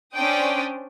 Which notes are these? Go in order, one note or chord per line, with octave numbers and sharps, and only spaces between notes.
C#4 D4 C5 D5 G5 D#6